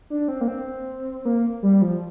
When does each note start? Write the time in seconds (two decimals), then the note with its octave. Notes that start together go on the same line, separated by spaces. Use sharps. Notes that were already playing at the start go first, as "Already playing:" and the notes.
0.10 D4
0.28 C4
0.41 A#3
0.48 C4
1.25 A#3
1.63 G3
1.82 F3